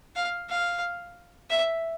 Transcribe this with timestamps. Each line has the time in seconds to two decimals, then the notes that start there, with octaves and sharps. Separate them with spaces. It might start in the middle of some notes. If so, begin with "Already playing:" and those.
0.16 F5
0.50 F5
1.50 E5